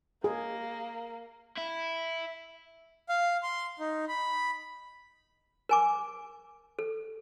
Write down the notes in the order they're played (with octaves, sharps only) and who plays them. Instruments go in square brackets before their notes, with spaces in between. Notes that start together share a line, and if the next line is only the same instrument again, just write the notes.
[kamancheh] A#3 [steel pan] G#4
[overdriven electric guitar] E4
[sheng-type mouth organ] F5
C6
D#4
B5
[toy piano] A#4 G#5 D6
A4